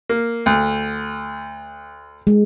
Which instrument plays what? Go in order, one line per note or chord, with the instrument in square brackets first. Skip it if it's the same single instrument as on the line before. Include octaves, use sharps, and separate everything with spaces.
[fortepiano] A#3
D2
[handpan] G#3